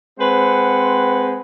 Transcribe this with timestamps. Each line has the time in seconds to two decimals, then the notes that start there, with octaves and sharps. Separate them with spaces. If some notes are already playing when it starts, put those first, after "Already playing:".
0.20 G#3 C4 B4 C5 F#5